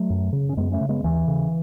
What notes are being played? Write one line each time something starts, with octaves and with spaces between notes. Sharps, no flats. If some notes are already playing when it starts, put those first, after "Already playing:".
Already playing: F#3 A3
F#2
C#3
C#4
F#2 G#3 B3
A3 C#4
C#3
G#3 B3
D#2 E3
C#3